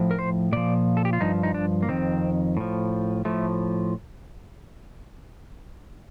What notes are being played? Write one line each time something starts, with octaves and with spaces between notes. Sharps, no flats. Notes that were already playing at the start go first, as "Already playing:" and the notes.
Already playing: A2 F3
A#4
C5
A#2 F3 D5
A4
G4
F4
G2 F3 D#4
D#4
D4
A#3
F2 D#3 C4
A2 F3
A2 F3 A3